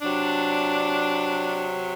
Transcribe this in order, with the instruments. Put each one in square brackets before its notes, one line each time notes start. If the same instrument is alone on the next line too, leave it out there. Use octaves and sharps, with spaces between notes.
[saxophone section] C3 F#3 D4